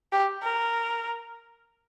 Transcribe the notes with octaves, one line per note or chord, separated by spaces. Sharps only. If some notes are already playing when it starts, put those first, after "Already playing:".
G4
A#4